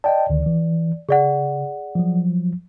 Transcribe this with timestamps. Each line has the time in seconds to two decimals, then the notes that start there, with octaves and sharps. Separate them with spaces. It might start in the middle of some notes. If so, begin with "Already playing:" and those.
0.04 D5 D#5 G5 A5
0.30 D2 D3 D#3
0.46 E3
1.09 C#3 G#4 D5 F#5
1.95 F3 F#3